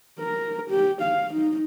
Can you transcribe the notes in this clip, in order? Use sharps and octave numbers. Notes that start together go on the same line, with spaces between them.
A#4
G4
F5
D#4